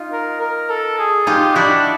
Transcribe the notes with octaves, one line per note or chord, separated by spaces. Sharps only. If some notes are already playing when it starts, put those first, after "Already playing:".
Already playing: D#4 F4
A#4
A#4
A4
G#4
D#4 F4 G4
D4 E4 F#4